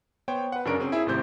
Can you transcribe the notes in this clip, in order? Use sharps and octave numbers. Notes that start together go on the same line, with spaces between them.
B3 C5 C#5 G5
B4 F#5
F#2 C#3 D4 A#4 C#6 D7
C4 C#4 G#4
E4 G#4 E5
G#1 A2 C3 C5 G6